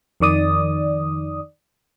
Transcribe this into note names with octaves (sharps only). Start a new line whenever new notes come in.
F2 D#3 D5 D#6